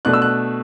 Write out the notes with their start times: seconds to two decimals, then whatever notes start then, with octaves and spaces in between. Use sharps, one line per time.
0.05 B2 A3 D4 F#6
0.13 E6
0.22 F#6